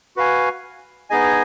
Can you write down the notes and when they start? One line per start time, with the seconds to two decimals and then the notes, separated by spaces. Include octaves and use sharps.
0.16 F#4 B4 F5 G#5
1.10 B3 D#4 G#4 D#5 G#5